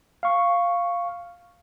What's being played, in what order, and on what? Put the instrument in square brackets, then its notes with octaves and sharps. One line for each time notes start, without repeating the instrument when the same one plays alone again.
[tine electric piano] F5 C#6